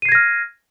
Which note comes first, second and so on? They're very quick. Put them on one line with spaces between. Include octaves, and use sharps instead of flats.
D#7 C7 G#6 A#6 F6